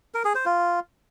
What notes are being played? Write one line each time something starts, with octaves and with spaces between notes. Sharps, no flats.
A#4
G#4
C5
F4